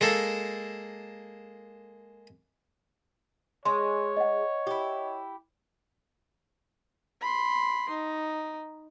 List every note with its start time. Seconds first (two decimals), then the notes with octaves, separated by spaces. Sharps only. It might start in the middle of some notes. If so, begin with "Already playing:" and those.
0.01 G#3 A#3 A4
3.65 G#3 C#5 C6
4.17 D#5 F#5
4.67 E4 G4
7.21 B5 C6
7.90 D#4